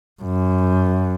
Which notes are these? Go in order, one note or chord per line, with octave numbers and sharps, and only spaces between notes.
F#2